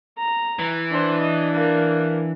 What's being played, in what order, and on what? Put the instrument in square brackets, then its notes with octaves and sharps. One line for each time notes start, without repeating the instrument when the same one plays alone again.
[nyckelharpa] A#5
[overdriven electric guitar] E3
[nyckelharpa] D4 [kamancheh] B4 C5
[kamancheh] D#5
A#3 A#4